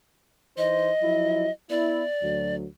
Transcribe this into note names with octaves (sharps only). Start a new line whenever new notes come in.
E3 D#4 C5 D#5
F3 F#3 E4
B3 E4 D5
D2 F#3